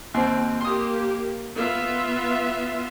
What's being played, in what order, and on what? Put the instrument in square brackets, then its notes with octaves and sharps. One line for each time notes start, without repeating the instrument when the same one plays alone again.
[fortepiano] D#2 C4
[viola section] A#3 G4 [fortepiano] C6 D#6
[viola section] B3 F4 E5